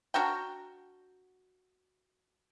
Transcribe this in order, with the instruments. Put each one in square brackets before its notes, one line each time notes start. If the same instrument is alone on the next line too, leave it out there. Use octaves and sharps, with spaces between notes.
[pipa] D4 F#4 A#4 G5